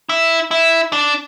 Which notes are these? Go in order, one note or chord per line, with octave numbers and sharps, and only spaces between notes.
E4
E4
D4